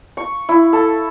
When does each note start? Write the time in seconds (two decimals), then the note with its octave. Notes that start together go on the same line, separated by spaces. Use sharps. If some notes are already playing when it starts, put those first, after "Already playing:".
0.17 C#6
0.49 E4
0.73 A4